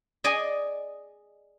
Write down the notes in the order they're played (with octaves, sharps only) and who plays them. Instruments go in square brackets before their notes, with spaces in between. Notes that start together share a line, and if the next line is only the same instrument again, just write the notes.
[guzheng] G#4 D5 D#5 G#5